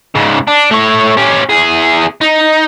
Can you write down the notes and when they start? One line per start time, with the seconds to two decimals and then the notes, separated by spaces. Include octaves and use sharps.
0.15 G#2 C#3
0.48 D4
0.71 A3 C#5
1.17 C#4 G4
1.50 E2 G#4
2.21 D#4